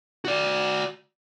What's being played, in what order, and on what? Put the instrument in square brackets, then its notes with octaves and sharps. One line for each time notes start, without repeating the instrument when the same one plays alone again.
[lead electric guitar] F#4 D5